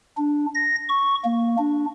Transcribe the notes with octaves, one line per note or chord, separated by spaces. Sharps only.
D4
A#6
C#6
A#3
D4